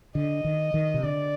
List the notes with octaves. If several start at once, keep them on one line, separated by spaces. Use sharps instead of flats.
D3 D#5
D#3
D#3
C3
D3 D5